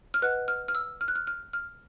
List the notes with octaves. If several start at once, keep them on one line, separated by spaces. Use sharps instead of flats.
F6
B4 D#5 F#5 F#6
F6
F6
E6
F6
F#6
F6
F6
F6